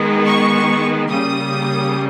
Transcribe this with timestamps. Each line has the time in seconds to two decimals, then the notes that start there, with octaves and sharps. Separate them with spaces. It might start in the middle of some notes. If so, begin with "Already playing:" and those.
Already playing: D#3 G#3 B3
0.26 C#6
1.09 C#3 G3 A#3 D#6